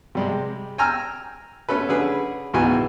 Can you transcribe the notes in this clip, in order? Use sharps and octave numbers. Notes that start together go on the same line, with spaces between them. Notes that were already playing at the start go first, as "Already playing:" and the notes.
C3 G3 G#3
G5 G#5 A#5 E6 F6
A3 C#4 A4 B4
D3 C#4 G#4 B4
C#2 G#2 B2 E3 G#5